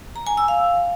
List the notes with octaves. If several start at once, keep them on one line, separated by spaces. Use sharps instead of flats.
A#5
G#5
E6
F5